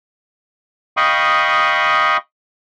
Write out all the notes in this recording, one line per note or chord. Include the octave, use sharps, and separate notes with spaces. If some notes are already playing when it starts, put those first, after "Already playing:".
D#5 F5 G5 B5 C#6 D#6